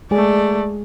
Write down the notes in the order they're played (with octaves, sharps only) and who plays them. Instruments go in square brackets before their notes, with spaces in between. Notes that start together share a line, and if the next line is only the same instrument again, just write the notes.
[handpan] G#3 G#4 [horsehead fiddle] A3 D5